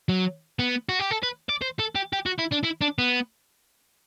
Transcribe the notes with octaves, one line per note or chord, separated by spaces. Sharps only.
F#3
B3
F#4
G4
A4
B4
D5
C5
A4
G4
G4
F#4
E4
D4
E4
D4
B3